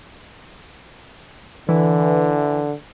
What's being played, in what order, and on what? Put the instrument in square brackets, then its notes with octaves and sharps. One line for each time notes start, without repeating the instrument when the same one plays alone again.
[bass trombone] D3 [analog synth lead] E3